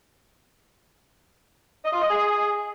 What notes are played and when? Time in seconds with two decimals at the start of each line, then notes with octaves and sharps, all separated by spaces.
1.84 D#5
1.93 F4
2.02 D#5
2.10 G#4